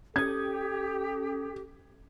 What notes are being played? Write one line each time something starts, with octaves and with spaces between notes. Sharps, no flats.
C#4 G4 A4 D#6 G#6